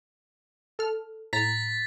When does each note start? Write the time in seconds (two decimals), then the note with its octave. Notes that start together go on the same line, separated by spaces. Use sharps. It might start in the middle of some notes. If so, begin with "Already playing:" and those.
0.79 A4 F6
1.33 A2 A#5 A6 B6